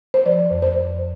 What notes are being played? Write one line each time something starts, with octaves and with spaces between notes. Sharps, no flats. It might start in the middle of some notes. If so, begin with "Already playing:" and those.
C5
F3 D5
F2
C5